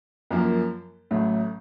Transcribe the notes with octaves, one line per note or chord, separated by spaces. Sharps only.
F#2 F3 A#3
A1 A2 F#3 A3